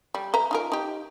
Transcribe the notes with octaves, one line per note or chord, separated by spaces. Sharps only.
G3
B4 E5 A#5
D#4 F4 A#4
D#4 G4